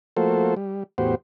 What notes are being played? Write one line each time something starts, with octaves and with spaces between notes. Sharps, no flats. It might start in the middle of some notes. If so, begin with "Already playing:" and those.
F3 A3 A#3 F#4 A4 C5
G3
E2 A2 B3 F#4 G4 C5